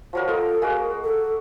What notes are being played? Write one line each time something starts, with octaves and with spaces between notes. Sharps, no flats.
F3 F#3 A#4
F4 A4 D#5
G#3 A#3 F#4 A#4
A4